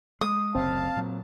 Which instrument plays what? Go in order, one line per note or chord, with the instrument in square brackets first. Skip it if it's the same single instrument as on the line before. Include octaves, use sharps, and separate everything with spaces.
[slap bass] G#3 [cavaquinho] D#6
[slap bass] F#1 D2 C3 [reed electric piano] C4 [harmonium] F5 A5
[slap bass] A#2 F#3